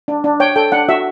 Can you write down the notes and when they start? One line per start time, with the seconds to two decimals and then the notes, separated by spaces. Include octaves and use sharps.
0.08 D4
0.24 D4
0.40 C#5 G5
0.56 A4 G5
0.72 D4 F#5
0.89 F#4 E5